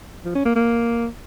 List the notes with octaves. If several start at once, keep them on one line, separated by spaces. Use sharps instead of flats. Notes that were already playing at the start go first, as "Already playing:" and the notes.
F3
C#4
A#3
A#3